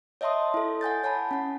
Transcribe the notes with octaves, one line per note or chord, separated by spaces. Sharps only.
C#5 D#5 E5 A5 C6 D#6
E4 A4
F#5 G#5 G6 A6
C#5 F#5 G#5 A5 B5
C#4 F#5